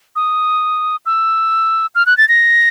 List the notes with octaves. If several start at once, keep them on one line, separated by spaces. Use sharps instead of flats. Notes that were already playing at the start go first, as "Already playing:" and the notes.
D#6
E6
F6
F#6
A6
A#6